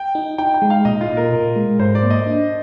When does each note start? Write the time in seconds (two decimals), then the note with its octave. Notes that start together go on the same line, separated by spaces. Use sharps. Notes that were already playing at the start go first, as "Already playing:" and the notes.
Already playing: G5
0.15 D#4
0.38 D#4 G5
0.54 G5
0.62 G#3
0.70 F5
0.85 A#2 D#5
1.01 F4
1.09 A#2
1.17 A#4
1.32 A#2
1.56 G#3
1.79 G#2 C5
1.95 D5
2.03 A#3
2.10 D#5
2.27 D4